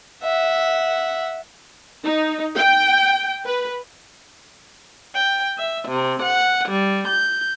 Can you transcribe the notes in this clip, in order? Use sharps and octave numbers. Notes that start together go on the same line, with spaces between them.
E5 F#5
D#4
G5
B4
G5
E5
C3
F#5
G3
G6